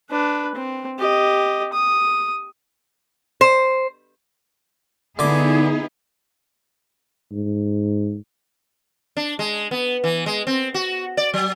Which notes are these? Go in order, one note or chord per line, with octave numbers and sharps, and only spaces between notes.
D4 B4
C4
G4 D#5
D#6
C5
D3 B3 D#4 E4 G#4 D6
G#2
D4
G#3
B3
E3
G#3
C4
F#4
D5
F#3